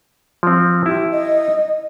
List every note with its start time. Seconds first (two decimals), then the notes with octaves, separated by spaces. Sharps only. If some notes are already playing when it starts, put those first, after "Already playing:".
0.43 F3 C4
0.86 E4 G4
1.11 D#5